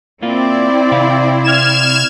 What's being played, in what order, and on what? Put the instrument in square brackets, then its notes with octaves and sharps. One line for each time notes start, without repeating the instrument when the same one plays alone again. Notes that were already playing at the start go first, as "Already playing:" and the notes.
[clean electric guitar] A#3 F4 [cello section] C4 E4 D5
[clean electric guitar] C3 F5 B5
[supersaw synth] F6 G#6 E7